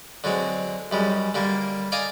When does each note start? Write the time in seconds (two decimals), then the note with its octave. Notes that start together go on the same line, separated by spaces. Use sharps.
0.24 D3 F#3 G#3 C4
0.91 F#2 G3 G#3
1.34 D3 G3 A#3
1.92 D5 D#5 F5 G#5 D#6